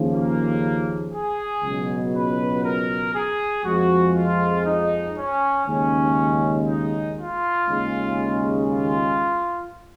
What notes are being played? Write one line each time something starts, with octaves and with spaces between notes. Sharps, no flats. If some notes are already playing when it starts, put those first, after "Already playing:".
Already playing: D#2 C#3 F3
A#3
G#4
C#2 B2 F#3
B4
A#4
G#4
F2 F3 G#3 F#4
F4
D#4
C#4
D#2 C#3 G#3 C#4
D#4
F4
D#2 C#3 G#3
F4